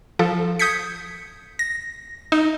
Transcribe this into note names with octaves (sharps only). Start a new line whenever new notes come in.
F3 A4
D#6 G6 G#6 B6 C#7
A#6
D#4